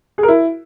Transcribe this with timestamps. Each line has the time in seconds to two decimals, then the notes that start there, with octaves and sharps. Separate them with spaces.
0.18 G#4
0.23 A#4
0.28 E4